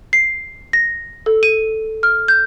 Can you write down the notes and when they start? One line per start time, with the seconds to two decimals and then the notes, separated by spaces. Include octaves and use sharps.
0.13 C7
0.73 A#6
1.26 A4
1.43 D#7
2.03 F6
2.28 G6